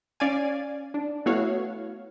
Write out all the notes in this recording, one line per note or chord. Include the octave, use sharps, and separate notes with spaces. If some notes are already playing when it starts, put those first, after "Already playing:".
C#4 D5 F5 G#5
D4
A3 B3 E4 F#4 C#5 F5